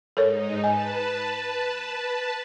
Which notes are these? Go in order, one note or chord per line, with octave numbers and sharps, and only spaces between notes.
G#2 D#4 A4 A#4 C#5
B4 D#5 G#5 A5